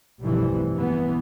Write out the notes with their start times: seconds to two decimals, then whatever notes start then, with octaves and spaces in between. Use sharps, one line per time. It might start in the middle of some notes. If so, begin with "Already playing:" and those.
0.21 F1 B1 G2 C3 E3 G3
0.76 E3 B3